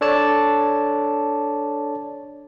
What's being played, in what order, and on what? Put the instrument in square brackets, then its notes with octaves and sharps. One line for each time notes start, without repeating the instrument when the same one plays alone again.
[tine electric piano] D4 A4 C#5 D5 A5